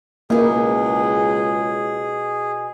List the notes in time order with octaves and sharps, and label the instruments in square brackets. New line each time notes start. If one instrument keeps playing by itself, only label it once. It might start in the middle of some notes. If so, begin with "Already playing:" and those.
[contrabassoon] C#2 [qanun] B2 E4 [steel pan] A#3 [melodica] G#4